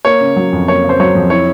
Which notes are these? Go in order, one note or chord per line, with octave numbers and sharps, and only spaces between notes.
A#3 C#5
C#3
F#3
F2
A#3 C#5
C#3
C5
F#3 C#5
F2
E4 C#5